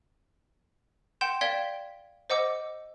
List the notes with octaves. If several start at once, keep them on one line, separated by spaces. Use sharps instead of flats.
F#5 G5 C6 G6 E7
D5 F5 G5 G#6 B6 G7
C5 D#5 F#5 D6 E6